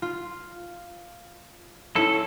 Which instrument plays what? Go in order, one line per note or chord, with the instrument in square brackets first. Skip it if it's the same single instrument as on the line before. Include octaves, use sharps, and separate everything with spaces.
[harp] F4
[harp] C#4 E4 [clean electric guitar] A4